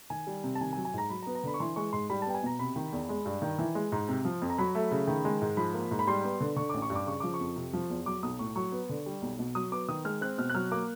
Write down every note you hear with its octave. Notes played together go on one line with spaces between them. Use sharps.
D#3 G#5
G3
C3
A5
D#3 G#5
G#5
F#3
G#5
G#2 A#5
F#3 B5
A#5
B3
A#5
D3 B5
C#6
E3 C6
G#3 C#6
G#2 C6
G3 B5
A5
B3 G5
G#5
B2 A#5
C3 B5
D#3
E2
G#3
G2
D#3
E3
G#3
G#2
C3
F3
F2
A#5
F#3 B5
A3
C#3
D#3
G#3
G#2
F3 B5
A#3
G#2
B5
G3 C6
B3
D3
D3 C#6
A1 D6
C#6
G2
D6
C#3 C#6
F3 D6
C#6
F2
C3
F3
E2
F#3 D6
B1 D#6
A2 C#6
F#3 C#6
B3
D3
G3
B1
B2
F#3 D#6
B3 D6
D#3 D#6
G#3 F6
C4 F#6
B2 F6
F#6
F#3 F6
A#3 D6